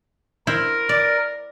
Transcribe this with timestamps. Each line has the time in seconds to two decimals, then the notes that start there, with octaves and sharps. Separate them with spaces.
0.47 E4 A#4 C5
0.89 D5